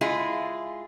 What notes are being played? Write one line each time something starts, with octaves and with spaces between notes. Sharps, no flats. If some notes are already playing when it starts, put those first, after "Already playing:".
G#3 E4 F4 G#4